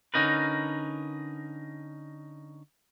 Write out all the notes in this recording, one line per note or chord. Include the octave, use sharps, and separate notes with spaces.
D3 C#4 D#4 A#4 B4